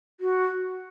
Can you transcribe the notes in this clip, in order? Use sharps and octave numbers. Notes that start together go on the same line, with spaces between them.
F#4